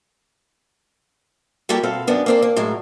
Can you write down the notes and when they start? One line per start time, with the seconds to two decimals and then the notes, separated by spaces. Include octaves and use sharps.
1.69 G3 A#3 E4 F#4 G4 A4
1.83 B2 C4 A4 F5
2.07 F#2 B3 D4
2.26 A#3 C4 D4
2.42 A#3
2.56 A2 F#3 G#3 A#4